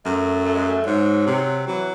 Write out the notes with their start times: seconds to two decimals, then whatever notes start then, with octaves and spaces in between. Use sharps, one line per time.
0.05 F#2 A3
0.46 A3
0.55 G#3
0.64 A3
0.86 G#2 F#3
1.27 C3
1.67 E3 F#3